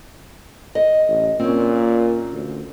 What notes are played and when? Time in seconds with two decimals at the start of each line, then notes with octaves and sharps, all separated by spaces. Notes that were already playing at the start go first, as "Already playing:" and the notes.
0.75 D#5
1.09 A1
1.40 A#2 C4 C#4
2.33 D2